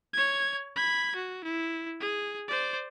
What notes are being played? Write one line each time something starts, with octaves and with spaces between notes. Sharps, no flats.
C#5 G#6
B5 G#6
F#4
E4
G#4
C5 D5